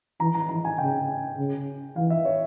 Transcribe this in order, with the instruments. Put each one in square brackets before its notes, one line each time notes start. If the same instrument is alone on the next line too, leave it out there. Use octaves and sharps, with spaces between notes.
[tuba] E3 [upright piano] A#5
[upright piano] A#5
[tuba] E3 [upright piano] A#5
[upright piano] G#5
[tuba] C#3 [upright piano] G5
[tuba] C#3
[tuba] E3 [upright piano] F5
[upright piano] E5
C#5